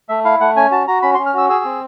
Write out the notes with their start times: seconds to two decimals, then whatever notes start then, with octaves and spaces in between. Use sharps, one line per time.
0.09 A3 E5
0.25 E4 F5
0.40 A3 F#5
0.56 C#4 G#5
0.71 F#4 A5
0.88 F#4 A#5
1.02 C#4 B5
1.15 C6
1.19 C#4
1.26 F6
1.34 F#4 E6
1.49 G#4 E6
1.65 C4